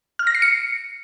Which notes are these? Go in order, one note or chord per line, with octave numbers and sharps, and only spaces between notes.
F6
A#6
C7
C#7